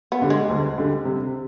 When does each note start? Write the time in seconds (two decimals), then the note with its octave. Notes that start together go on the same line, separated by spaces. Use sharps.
0.12 B3
0.22 D3 G3
0.30 G#3
0.49 D2
0.78 D3 G3
1.05 C3